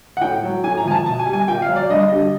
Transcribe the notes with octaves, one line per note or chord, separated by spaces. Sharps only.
F#5
A2 G5
F#3
A2 G#5
A#5
F3 G#5
A5
B2 A5
G#5
G3
G#5
A#2 G5
F5
F#3
D5
G2 D#5
D3 G3